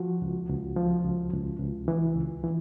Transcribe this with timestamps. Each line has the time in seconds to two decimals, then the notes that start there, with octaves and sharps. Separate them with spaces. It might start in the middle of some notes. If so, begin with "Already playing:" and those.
Already playing: F3 F#4
0.22 C#2
0.49 C#2
0.76 F3
1.04 C#2
1.33 C#2
1.60 C#2
1.88 E3
2.15 C#2
2.44 E3